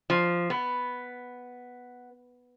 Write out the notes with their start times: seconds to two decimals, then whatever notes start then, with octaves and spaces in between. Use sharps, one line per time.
0.10 F3
0.50 B3